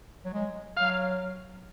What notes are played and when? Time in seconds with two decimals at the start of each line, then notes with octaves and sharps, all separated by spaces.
0.25 F#3
0.33 G#3
0.77 F#3 F5